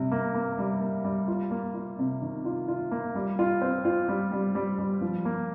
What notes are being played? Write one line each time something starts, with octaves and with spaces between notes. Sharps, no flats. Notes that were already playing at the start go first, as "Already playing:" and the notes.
Already playing: C3 G3
A#3
A#3
G3
A#3
G3
F4
A#3
F4
C3
D#3
F4
F4
A#3
G3
F4
C4
F4
G3
G3
G3
G3
F3
A#3